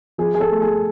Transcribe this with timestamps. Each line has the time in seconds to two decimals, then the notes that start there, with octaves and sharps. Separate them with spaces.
0.18 F3 G#4
0.35 F3 G#4
0.41 A4
0.51 A3
0.62 G#4
0.67 A3